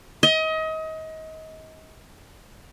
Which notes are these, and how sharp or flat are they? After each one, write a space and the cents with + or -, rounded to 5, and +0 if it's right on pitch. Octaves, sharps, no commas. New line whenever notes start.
D#5 +30